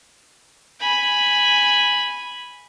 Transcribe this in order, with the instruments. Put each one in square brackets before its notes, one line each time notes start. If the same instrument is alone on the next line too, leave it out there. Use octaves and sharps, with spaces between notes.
[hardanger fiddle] G#5 B5